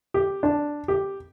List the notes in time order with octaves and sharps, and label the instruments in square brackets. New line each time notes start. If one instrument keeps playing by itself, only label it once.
[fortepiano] G4
D4
G4